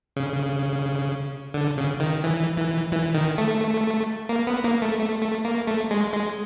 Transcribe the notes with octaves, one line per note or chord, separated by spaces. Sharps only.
C#3
D3
C#3
D#3
E3
E3
E3
D#3
A3
A#3
B3
A#3
A3
A3
A3
A#3
A3
G#3
G#3